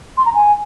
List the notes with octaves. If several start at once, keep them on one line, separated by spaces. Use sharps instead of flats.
C6
A#5
G#5